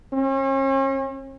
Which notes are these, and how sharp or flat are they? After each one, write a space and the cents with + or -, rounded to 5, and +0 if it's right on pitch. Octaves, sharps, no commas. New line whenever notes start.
C#4 -40